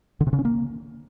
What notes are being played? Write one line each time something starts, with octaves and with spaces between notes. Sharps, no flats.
D3
C3
C#3
C#4
A#3